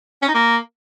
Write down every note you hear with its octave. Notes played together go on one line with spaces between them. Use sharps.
C#4
D#4
A#3